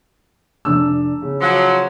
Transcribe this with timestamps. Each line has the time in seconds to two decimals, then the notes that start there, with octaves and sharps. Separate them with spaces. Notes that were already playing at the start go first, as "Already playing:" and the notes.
0.65 F1 D4 E6
1.22 C#3
1.41 F3 F#3